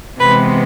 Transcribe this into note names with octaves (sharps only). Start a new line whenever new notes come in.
C3 E3 G#3 B3 B4